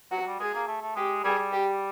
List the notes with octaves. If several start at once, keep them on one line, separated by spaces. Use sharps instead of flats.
F#3 F#4
F#3
G3
G#3 G#4
A#3
A3
A3
G#3 G4
G3 G#4
G3
G4